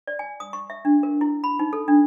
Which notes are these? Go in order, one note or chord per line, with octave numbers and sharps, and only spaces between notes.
D5
G#5
D#6
C#6
E5
D4
A#4
E4
B5
D#4
A4
D4